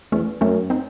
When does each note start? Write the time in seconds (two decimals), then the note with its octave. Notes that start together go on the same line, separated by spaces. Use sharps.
0.12 E2 A3 C#4
0.41 F#2 A3 C#4
0.70 C4 D#4